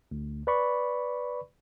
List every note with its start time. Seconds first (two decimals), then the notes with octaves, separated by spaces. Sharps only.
0.11 D2
0.47 B4 D5 B5 C#6